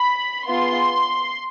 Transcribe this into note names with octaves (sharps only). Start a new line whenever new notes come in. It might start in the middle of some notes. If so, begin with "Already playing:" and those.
Already playing: B5
B3 F4 G#4 C6